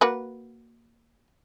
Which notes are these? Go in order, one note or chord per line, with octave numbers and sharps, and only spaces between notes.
A#3 F#4 B4